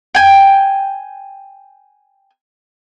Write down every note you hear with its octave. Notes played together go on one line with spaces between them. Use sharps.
G5 G#5